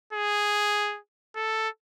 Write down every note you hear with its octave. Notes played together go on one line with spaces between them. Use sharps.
G#4
A4